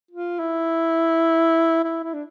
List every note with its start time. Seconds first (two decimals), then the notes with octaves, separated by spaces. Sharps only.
0.11 F4
0.39 E4
1.84 E4
2.03 E4
2.13 D4